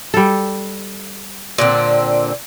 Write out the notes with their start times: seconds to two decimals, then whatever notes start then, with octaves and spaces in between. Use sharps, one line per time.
0.14 G3 A4
1.58 A#2 D3 C4